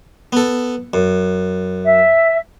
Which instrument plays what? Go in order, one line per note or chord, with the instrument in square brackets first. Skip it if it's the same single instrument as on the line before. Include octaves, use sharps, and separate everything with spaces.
[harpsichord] B3 A4
F#2
[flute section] E5